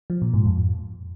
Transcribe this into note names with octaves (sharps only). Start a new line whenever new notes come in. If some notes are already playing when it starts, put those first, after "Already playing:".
F3
A#2
G#2
F2